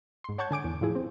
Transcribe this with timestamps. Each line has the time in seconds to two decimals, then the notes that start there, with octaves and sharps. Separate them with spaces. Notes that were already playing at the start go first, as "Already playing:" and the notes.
0.24 G#2 C6
0.38 C#5 F#5 A5 C#6 G6 G#6
0.51 D3 G#5 D6 D7
0.64 E2
0.81 A2 F3 E4 G#4
0.95 C4